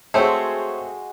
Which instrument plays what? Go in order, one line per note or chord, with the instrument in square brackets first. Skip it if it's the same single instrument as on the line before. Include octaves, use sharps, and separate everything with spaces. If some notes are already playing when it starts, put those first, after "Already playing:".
[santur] G#3 F#4 [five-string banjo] A3 C4 [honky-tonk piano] G#4 C5 C#5